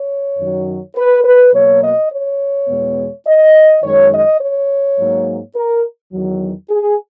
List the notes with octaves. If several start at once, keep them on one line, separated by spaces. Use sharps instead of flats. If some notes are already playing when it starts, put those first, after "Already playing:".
Already playing: C#5
F#2 D#3 F#3
B4
B4
B2 F#3 A#3 C#5
D#5
C#5
E2 B2 G#3 B3
D#5
F#2 D#3 G#3 C#5
D#5
C#5
G#2 F#3 A#3
A#4
E2 D#3 F#3
G#4